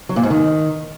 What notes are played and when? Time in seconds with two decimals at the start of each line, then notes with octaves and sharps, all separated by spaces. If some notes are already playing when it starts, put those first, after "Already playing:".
0.09 F#3
0.16 A#2
0.23 G#2
0.30 D#3